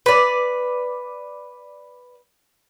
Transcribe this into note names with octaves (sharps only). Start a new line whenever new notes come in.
B4 D5